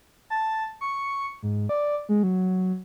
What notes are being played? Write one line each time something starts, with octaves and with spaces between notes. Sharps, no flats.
A5
C#6
G#2
D5
G#3
F#3